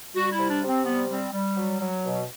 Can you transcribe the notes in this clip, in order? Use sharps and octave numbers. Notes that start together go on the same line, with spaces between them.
G3 F#4
E4
C3
D4
C3
C4
G3 B3
G3 C4
G3
F#3
F#3
B2